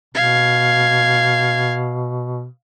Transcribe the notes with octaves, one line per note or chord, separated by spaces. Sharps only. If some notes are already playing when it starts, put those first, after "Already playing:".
B2 F5 G#6